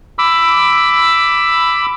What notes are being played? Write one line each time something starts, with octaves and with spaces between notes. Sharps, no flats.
B5 D6 E6